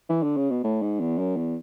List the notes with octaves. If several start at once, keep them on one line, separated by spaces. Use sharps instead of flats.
E3
D3
C#3
B2
A2
G#2
E2
F#2
E2